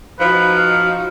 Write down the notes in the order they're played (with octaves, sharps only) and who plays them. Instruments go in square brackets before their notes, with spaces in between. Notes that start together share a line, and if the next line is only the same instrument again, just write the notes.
[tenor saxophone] F3 [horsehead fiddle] D#4 F#4 [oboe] B4
[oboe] F5